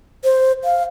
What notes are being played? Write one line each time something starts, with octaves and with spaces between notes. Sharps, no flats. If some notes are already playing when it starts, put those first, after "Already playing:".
C5
F5